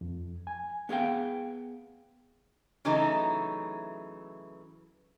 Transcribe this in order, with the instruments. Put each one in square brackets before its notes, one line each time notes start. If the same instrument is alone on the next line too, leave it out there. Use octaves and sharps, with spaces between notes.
[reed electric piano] F2
G#5
[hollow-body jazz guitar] B3 G#4 F5 G5
[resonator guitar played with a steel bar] C#3 E3 F#3 A3 D#4